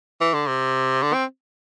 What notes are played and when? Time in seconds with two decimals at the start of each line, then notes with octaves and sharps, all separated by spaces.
0.20 E3
0.34 D3
0.47 C3
1.02 D3
1.14 C4